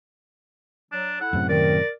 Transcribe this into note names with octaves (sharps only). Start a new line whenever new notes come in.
F#3 D4
E4 A4 F#5
F#2 A2 C3
D#3 A#4 D5